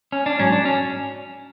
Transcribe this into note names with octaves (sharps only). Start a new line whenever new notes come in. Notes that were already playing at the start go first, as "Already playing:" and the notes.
C#4
D4
G#2 F#3 C#4
D4
C#4